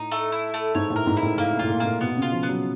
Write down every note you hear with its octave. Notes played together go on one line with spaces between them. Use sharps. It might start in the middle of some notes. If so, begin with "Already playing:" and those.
Already playing: A2 D#4
A3
E4
A3
G#2 C#5
A2
A#4
G#2
E4
A2
A2 A#3
A#2
A2 F4
A#2
A#2 A#3
B2 B3
C#3
F4
F3
B3
F#3